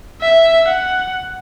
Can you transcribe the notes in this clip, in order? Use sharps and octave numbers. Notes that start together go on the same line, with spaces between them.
E5
F#5